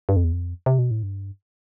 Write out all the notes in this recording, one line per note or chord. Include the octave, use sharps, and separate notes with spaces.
G2
F2
E2
F2
C3
B2
A2
G2